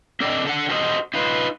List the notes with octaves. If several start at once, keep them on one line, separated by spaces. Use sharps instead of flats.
C4 D4 A4 D5 D#5 G5
D3 A4 F#5
F#4 G4 A4 C5 D5 D#5
D#4 F4 B4